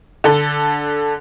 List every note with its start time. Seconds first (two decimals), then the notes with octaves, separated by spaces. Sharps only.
0.24 D3 A4